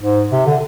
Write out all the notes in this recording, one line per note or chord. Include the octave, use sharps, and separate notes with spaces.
G#2
C3
D3